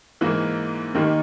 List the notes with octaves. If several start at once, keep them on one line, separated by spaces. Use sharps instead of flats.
G#2 E3 A#3
D#2 D#3 A#3 D#4 G4